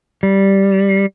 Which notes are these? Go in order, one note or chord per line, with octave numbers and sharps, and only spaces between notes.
G3